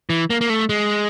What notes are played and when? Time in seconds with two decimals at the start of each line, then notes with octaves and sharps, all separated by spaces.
0.10 E3
0.30 A#3
0.41 A#3
0.50 A3
0.69 G#3